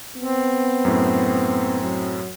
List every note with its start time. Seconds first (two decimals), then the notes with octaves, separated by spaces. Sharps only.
0.17 B3 C4
0.85 F#2 A2
1.83 F#3